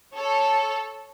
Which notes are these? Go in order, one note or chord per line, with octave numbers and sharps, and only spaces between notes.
A4 C#5